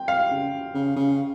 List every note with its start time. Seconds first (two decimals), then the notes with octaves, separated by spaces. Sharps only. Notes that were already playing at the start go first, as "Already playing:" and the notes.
Already playing: G5
0.08 F5
0.31 C#3
0.74 C#3
0.96 C#3